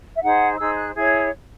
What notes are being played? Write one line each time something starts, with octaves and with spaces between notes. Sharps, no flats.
E5
D#4 G#4 C5 F#5
D#4 G#4 C5 E6
F#6
E4 G#4 C#5 G#6